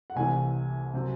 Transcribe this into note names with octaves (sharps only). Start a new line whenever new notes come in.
F#5
C2 C3 E3 A3 C4 G#5
C3 F#3 C4